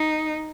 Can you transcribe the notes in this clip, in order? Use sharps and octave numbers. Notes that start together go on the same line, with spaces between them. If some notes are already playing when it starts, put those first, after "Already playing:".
Already playing: D#4